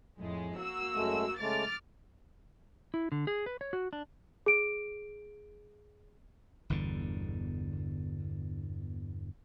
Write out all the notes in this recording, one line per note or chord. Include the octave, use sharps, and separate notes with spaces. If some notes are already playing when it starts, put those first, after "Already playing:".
F2 A2 G#3
A#3 F#4 E6
F#2 G#3 A3
C#3 G#3 A3 D6 F6 A6
E4
D3
G#4
B4
C#5
F#4
D4
G#4 D7
G1 E2 B2 D3